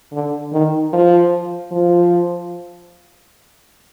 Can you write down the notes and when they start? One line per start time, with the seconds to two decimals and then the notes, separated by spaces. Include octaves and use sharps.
0.12 D3
0.52 D#3
0.93 F3
1.72 F3